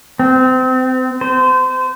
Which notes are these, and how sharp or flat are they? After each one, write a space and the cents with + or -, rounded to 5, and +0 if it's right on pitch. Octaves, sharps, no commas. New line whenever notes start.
C4 -30
C5 -30